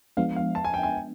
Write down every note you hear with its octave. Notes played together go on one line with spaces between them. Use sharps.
F3 G#3 B3 D4 F5
F5
A5
G#5
G5
G#5